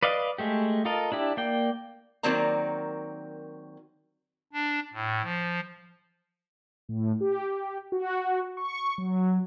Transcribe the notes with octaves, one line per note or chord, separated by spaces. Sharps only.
B4 D5 D#5 F5
G#3 A3 G4
F4 A4 A#4 D#5
D4 E4 G4
A#3 D5 G5
D#3 F#3 A#3 C4 D5 A#5
D4
A2
F3
A2
G4
F#4
C#6
F#3